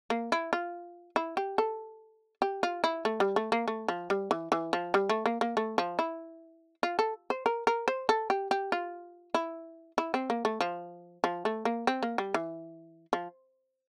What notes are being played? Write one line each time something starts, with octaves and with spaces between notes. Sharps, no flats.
A#3
E4
F4
E4
G4
A4
G4
F4
E4
A3
G3
A3
A#3
A3
F3
G3
E3
E3
F3
G3
A3
A#3
A#3
A3
F3
E4
F4
A4
C5
A#4
A#4
C5
A4
G4
G4
F4
E4
E4
C4
A#3
A3
F3
F3
A3
A#3
C4
A#3
G3
E3
F3